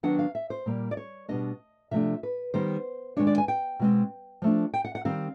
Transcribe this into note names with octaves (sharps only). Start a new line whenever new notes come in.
D#3 F#3 B3 D4 F#5
F5
E5
C5
A#2 G3 A#3
D5
C#5
B2 G3 B3 D4 D#5
C3 F3 A3 D4 E5
B4
D#3 G3 B3 D#4 C5
D#3 G#3 B3 D4 C#5
D5
G#5
G5
B2 G#3 C4
F3 A3 D4
G5
F#5
F#5
D#3 G3 C4 F5